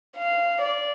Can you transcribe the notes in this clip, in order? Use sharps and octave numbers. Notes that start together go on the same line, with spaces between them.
F5
D5